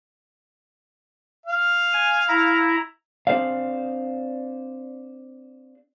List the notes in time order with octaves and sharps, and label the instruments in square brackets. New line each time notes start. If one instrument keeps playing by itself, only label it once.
[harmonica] F5
[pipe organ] G#5
E4 A#5
[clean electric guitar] C4 D4 G#4 C5 D5 F5